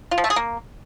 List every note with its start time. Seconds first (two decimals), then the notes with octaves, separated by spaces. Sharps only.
0.11 F4
0.18 F3
0.24 A3
0.30 G#4
0.36 A#3